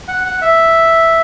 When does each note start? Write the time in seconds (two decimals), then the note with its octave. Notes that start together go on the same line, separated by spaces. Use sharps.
0.08 F#5
0.25 F#5
0.42 E5